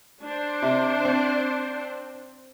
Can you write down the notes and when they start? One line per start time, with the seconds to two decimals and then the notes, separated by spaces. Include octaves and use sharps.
0.24 D4 C5
0.62 C3
1.05 C4